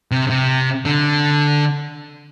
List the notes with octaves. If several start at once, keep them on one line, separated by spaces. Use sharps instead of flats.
C3
C3
D3